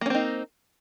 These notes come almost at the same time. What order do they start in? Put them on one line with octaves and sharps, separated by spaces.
A#3 C#4 C4 D#4